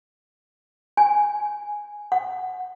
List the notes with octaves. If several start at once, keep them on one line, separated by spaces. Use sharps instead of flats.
G#5
F#5